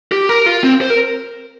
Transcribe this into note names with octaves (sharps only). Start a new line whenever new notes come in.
G4
A#4
F4
C4
C5
A#4